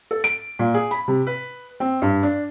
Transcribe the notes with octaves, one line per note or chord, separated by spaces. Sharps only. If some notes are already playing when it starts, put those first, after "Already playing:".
A4
D7
A#2
G#4
B5
C3
B4
C4
G2
D4